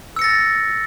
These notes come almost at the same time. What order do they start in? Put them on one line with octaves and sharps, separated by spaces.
E6 C#7 A#6 A6